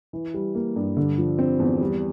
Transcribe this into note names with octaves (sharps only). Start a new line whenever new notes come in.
E3
G3
A#3
G2
D3
F3
C4
E2
G3